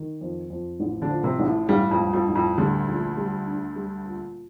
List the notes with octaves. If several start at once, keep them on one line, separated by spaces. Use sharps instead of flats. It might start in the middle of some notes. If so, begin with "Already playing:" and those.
Already playing: D#3
F2
F2
A1
D3 D4
F3
C3 C4
A1
A2 A3
A1 G2 G3
F2 F3
G2
F2 F3
A1
F2 F3
D2 D3 G3
A#1
G3
D4
G3
A#2